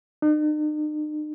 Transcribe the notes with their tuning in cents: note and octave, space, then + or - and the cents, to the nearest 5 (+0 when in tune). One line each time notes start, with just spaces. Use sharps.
D#4 -45